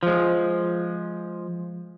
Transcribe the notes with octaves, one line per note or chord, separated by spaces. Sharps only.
F3 G#3